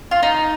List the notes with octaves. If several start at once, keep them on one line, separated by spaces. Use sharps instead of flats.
F4
D#4